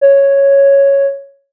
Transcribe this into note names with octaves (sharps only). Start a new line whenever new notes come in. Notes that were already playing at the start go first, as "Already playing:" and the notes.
C#5